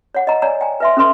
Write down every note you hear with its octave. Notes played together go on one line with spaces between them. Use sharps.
C#5 F#5
D#5 A#5
C#5 D5 G#5 A#5
G5 G#5
B4 E5 C6
C#4 A4 B4 C6